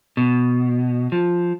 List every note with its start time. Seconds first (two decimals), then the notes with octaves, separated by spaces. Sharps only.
0.17 B2
1.12 F3